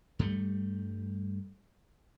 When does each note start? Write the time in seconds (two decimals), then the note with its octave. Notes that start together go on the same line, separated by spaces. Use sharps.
0.19 G2 G3 A3